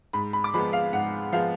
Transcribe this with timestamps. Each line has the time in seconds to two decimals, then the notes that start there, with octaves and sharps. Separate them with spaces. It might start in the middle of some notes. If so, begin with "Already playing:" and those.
0.13 G#2 B5
0.33 B5
0.44 D6
0.54 F3 G#3 B3 B5
0.73 F5
0.93 G#2 F#5
1.32 F3 G#3 B3 F5